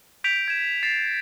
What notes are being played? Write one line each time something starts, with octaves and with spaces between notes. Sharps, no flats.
G6 B6 D7 F7
G#6 E7
A6 C7 E7